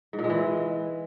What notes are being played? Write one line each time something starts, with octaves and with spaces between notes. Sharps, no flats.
G#2
A#2
G#3
E3